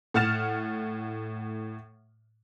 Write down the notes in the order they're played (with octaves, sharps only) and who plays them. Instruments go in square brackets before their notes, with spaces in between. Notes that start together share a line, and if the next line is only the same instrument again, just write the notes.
[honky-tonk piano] A2 F#5 F6 A6 E7